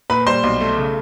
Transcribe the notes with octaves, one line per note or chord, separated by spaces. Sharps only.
A#2 B4 B5
G3 C5 C6
B1
A3
C#3